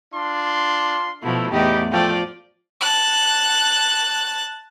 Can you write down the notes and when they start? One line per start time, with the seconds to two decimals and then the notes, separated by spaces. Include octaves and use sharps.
0.13 D4 F4 C6
1.22 B2 F3 A3 E4
1.51 E2 A2 D#4 G4 D5
1.91 F3 A3 F4 D5 G5
2.81 A5 F#6